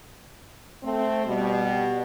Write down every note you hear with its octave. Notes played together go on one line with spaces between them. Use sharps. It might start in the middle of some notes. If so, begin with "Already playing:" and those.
A3 C4
B2 G3